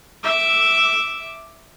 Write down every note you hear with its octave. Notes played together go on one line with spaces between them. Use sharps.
E5 D6